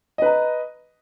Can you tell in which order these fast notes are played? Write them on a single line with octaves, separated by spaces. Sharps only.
D#5 B4 A#5